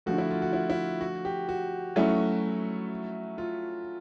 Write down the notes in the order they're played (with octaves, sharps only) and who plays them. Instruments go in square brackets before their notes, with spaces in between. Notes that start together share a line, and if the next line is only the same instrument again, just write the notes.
[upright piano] D3 F3 A3 [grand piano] F#4
[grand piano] E4
F4
F#4
E4
E4
F#4
G4
F#4
[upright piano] F#3 A3 C#4 E4
[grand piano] F4